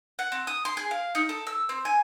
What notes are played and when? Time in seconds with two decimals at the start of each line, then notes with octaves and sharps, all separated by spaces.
0.19 F#5
0.32 C4
0.47 D#6
0.65 C6
0.77 G#4
0.91 F5
1.15 D#4
1.29 A4
1.47 E6
1.69 C4
1.85 G#5